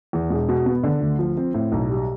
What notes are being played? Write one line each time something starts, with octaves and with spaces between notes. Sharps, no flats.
E2
E1
B2
B3
D3
D2
F3
C4
A2
B1
G3